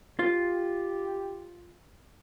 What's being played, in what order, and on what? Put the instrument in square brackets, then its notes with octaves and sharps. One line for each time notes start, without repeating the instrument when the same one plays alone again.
[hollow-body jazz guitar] F4 [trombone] G4